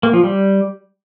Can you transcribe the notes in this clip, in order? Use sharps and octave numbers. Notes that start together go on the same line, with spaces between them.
A#3
F3
G3